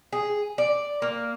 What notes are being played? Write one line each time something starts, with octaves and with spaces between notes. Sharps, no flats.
G#4
D5
A#3